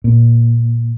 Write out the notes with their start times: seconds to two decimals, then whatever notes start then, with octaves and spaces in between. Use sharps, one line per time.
0.04 A#2